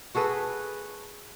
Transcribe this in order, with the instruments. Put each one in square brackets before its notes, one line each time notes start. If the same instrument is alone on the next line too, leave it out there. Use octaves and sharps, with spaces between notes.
[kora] F#4 G#4 A4 B4